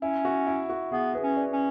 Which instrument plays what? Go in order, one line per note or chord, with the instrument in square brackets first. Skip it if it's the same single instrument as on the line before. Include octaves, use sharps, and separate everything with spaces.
[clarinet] C#4 [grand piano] E4
[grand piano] F#4
E4
F#4
[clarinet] B3 [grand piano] E4 G#4
[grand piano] G#4 B4
[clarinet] C#4
[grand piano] B4 D5
[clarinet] C#4